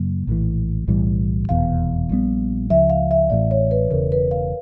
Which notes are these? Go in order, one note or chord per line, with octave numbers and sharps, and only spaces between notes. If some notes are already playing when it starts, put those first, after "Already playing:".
Already playing: F#2 C#3 F#3 A#3
A#1 A2 E3
B1 A2 E3 G3
F1 E2 B2 F5
A#1 A#2 G3 B3
C#2 C#3 F3 E5
F5
E5
A1 A2 E3 D5
C#5
B4
E1 E2 C#3 A#4
B4
F5